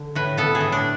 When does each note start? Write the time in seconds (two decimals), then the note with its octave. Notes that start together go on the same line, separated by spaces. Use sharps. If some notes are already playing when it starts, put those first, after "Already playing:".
Already playing: D3
0.15 A2 B4
0.37 B3 A4
0.55 G#4
0.60 A2
0.72 D4